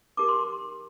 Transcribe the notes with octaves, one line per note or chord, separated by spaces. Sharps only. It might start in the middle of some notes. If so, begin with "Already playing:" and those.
D#4 G4 A#4 D6
C6